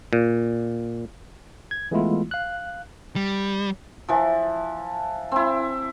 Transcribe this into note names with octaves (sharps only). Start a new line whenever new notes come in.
A#2
G#6
E3 G#3 A3 B3 E4 F4
F5 F#6
G3
E3 F3
C4 E4